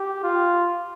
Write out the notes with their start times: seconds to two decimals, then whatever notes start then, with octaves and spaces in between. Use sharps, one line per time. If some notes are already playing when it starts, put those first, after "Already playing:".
Already playing: G4
0.24 F4